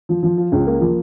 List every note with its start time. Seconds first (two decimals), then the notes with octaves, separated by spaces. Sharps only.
0.09 F3
0.23 F3
0.37 F4
0.52 C#2
0.67 A#3
0.81 F3